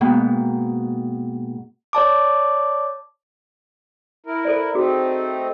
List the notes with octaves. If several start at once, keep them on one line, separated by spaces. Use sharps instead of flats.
G#2 B2 A#3 B3 G5 F#6
C#5 D5 A5 D6
E4 A#4
A4 C5 D5
A3 C4 D#4 F#4 G#4